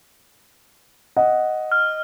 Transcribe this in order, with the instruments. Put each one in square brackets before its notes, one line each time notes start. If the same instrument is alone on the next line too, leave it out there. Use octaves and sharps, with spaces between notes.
[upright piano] D#5 F#5
[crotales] F6